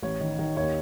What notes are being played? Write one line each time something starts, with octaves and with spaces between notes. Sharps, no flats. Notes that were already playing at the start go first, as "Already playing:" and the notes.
A1 C#5
D#3
D#3
D#2 C#5